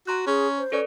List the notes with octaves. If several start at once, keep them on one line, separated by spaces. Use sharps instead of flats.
F#4 A#5 C6 F#6
C#4 G#4
C5
C#4 A4 B4 D5